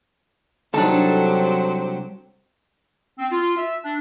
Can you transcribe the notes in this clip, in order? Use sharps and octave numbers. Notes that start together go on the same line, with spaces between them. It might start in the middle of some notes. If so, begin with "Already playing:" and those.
C2 F#3 D4 D#4 G4 A4 C5 A5
C4
F4
E5
D4